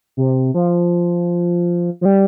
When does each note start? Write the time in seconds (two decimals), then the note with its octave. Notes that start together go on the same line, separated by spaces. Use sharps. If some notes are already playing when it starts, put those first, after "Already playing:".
0.17 C3
0.54 F3
2.01 F3
2.05 G3